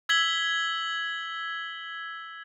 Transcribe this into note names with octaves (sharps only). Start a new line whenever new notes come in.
E6 G#6 B6 F#7 G7